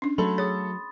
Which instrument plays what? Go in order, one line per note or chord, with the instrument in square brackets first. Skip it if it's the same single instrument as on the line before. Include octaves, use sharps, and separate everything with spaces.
[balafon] C#4 D4
[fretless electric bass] F#3 [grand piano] A3 A4 [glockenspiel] B5 C6
[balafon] G#4 C#5 [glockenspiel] D#6 A6